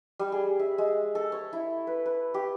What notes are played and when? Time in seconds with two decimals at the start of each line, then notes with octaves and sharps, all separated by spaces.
0.19 G3
0.32 G#4
0.59 E5
0.78 G#3
1.15 A4
1.32 C#5
1.53 E4
1.87 B4
2.06 B4
2.34 G4